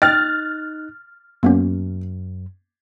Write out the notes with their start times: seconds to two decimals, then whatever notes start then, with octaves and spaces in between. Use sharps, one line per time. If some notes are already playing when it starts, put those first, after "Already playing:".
0.02 D#4 D#5 G5 F6 F#6 A6
1.43 F#2 A#3 B3 C#4